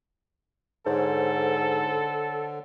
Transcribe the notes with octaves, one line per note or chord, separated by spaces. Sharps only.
G#2 D3 A4 C5 C#5